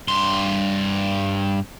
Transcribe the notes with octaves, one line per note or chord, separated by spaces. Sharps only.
G2 C6